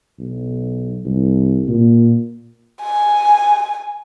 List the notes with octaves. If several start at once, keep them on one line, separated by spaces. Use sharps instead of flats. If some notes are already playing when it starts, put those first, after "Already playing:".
B1
C2
A#2
G#5